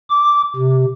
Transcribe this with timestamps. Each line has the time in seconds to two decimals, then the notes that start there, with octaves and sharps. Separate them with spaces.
0.10 D6
0.56 C3